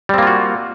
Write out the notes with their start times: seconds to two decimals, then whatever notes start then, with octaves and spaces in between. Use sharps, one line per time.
0.09 G3
0.14 C4
0.18 A#3
0.23 F4
0.27 F#4